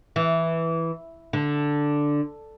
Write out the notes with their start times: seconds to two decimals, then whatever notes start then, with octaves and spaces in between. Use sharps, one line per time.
0.16 E3
1.33 D3